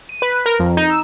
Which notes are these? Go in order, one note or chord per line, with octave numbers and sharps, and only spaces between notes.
D#7
B4
A#4
F2
D#4
E6